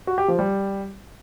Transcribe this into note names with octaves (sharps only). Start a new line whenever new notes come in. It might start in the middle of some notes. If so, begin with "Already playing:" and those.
F#4
G4
F3
G3